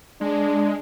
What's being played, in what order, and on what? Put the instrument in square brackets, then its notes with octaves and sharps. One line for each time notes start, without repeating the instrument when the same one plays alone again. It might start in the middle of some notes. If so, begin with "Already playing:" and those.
[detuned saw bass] G#3 [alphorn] D4